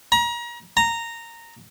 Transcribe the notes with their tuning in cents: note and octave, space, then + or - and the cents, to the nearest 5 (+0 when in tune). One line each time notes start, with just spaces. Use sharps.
A#5 +35
A#5 -10